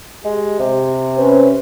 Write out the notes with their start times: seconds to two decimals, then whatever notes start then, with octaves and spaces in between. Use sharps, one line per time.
0.24 G#3 G4
0.59 C3
1.17 C#4 B4 C5